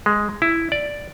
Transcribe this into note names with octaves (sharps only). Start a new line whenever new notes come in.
G#3
E4
D5